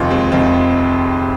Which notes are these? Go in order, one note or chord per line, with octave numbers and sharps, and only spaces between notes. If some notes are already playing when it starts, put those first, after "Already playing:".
Already playing: F1 D#2 D#3 C4 F4
G#3 C4
F1 D#2 D#3 C4 F4